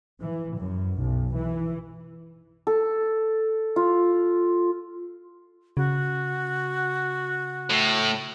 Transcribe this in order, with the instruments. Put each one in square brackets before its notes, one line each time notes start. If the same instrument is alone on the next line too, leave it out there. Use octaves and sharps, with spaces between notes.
[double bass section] E3
F#2
B1
E3
[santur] A4
F4
[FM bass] C#3 [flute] F#4
[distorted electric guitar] A2